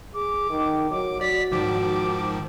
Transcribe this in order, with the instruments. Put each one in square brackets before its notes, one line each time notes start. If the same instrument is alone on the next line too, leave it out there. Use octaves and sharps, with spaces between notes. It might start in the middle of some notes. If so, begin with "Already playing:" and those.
[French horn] G#4 [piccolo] D6
[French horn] D#3
[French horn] F#3 [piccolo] D6
[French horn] F#4 [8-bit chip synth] D5 [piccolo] B6
[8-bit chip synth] G#2 D#3 F3 [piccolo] D6